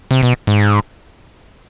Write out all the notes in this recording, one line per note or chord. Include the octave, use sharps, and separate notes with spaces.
C3
B2
G#2